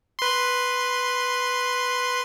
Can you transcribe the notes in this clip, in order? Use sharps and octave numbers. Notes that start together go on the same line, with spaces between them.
B4 C6